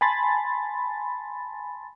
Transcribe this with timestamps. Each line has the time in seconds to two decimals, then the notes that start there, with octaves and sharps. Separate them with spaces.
0.01 G#5 A5 B5 C6 A6